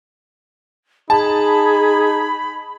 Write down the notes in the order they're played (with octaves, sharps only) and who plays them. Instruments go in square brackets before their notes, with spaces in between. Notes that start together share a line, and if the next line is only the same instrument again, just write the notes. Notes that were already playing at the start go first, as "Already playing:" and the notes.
[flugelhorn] D#4 [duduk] G#4 [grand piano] A5 [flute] B5